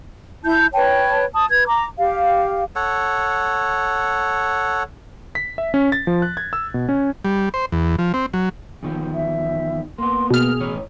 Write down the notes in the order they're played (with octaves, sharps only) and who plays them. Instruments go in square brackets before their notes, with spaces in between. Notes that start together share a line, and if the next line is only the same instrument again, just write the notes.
[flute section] E4 A5 G6
B4 C#5 G5 A5
A5 D#6
B4 G#6
A#5 D6
G4 F5
[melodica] A4 C#5 F#5
[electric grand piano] B6
E5
C#4
A6
F3
F#6
G#6
E6
B2
C#4
[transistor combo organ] G3
C5
E2
F3
C4
F#3
[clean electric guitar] E2 D#3 F3
[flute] E5
[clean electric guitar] A#3 B3 [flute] C6
[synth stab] B2 F6 [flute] G#4
[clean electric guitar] A2 E3 C#5